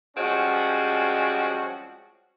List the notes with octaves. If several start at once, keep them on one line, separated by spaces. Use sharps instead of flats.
F3 G3 G#3 C4 C#4 F#4